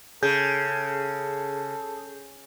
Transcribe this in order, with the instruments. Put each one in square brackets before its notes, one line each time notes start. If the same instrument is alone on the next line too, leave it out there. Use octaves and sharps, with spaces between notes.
[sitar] C#3 [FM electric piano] G#4 [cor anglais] A4 [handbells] G6